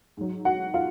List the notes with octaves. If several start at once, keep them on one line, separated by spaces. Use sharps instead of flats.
G#2 F#3
F#4 F#5
F4 F5